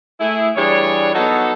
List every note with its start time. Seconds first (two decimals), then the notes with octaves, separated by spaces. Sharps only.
0.20 A3 E4 G#4
0.56 E3 G3 D4 G#4 C#5
1.15 F#3 B3 D#4 F#4 A4